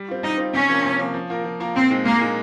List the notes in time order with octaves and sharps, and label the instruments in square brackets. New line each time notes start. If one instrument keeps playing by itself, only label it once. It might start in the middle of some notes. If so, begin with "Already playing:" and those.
Already playing: [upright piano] G3
C4 F4
[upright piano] G3 [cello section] D#4
[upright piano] C4 F4
[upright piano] C3 [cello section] C#4
[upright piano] F3 A#3
C3
F3 A#3
F3
A#3 F4 A#4
F3
A#3 F4 A#4
[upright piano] A#2 [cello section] C4
[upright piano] G#3 D#4
[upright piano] A#2 [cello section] A#3
[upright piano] G#3 D#4